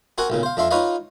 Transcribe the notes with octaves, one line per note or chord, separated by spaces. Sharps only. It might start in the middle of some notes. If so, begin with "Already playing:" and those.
C4 F#4 A#4 F#5 G#5
B1 A#2 C#3
C5 F5
F2 D4 E5 F5 C6
D#4 F4 B4 C#5 D#5 F5